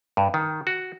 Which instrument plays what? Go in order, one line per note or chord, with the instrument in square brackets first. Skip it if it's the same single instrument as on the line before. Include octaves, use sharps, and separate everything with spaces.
[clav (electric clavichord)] G2
D#3
F#4